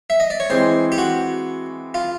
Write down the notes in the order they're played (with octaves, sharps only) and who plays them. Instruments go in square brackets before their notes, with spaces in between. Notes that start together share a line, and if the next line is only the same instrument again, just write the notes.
[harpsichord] E5
D#5
D5
C#5
[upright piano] E3 G#3 C4 [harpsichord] C5
[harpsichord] G4
F#4
F4